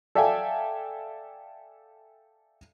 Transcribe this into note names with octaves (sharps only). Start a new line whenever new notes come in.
A4 D5 E5 F5 G5 G#5